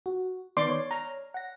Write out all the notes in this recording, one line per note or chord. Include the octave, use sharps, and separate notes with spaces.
F#4
D#3 B3 D5 C6 D6
C#5
A#5
F#5 A#6